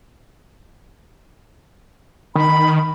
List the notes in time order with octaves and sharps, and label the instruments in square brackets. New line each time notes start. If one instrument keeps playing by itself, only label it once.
[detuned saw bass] D#3 [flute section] B5